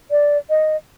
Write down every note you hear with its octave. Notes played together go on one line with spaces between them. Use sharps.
D5
D#5